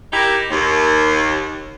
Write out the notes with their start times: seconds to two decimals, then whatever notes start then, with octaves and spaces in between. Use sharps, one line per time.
0.13 D#4 E4 G4 A#4
0.50 D#2